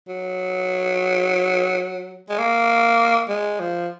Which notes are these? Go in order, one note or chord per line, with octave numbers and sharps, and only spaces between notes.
F#3
G#3
A#3
G#3
F3